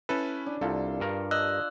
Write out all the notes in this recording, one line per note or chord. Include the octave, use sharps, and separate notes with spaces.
C#4 E4 A4 B4
D4
C2 F4 A4
G2 A#4
D5 D#5 E6 F#6